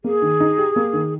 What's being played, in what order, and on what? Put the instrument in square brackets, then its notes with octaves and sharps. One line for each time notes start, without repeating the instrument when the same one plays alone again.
[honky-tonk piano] A#3 [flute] G#4
[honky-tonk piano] D#3
D#4
G4
A#3
D#3